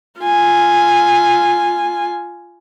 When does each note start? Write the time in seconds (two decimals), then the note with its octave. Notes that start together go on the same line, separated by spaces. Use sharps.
0.20 F4 G#5